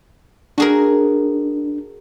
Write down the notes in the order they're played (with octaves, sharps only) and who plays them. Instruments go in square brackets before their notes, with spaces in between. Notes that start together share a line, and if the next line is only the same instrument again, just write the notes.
[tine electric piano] D4 [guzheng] F#4 G#4 A#4